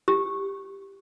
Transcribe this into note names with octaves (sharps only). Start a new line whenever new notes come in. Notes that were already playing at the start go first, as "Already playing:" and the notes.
G4